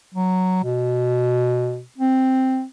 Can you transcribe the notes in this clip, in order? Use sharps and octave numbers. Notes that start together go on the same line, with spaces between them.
F#3
B2
C4